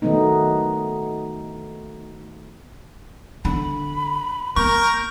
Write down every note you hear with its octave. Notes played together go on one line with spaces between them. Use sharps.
D#3 F#3 A3 B3 D#4
D3 B5
A#3 A#4 C#6 G6